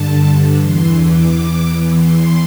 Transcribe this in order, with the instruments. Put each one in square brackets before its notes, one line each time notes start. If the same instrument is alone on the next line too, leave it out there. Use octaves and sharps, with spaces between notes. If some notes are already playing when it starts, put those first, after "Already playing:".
Already playing: [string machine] G2 D3 A5
E2 E3 C6
D6
E2 E3
C6